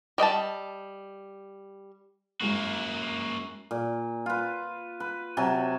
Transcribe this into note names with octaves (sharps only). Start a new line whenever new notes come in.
G3 D#5 G5 A5
F#2 G#3 A#3 E4 F#4
A#2
F4 B4
B4
C3 F#3 G#5 A5